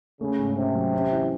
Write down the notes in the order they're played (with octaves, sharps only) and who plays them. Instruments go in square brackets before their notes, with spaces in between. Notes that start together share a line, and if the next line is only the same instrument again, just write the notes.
[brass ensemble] C#3 [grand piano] A3
[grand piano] G#2
[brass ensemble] C3 [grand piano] C#4
[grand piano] F#3
C#4
E3